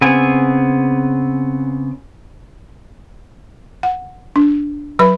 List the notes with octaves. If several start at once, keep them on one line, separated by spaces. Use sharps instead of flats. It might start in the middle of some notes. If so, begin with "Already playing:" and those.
C#3 B3 C4 G#5
F#5
D4
F#3 B4 B5